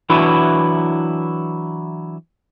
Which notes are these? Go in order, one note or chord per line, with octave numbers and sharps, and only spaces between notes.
E3 F#3 D4 E4 F#4 B4